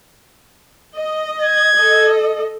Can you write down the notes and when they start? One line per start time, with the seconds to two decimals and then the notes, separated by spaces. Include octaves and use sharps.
0.95 D#5
1.42 G#6
1.75 A4 D#5